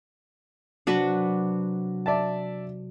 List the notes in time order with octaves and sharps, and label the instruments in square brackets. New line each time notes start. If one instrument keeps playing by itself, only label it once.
[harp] C3 F#3 [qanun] D4 F#4 B4
[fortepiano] D5 E5 A5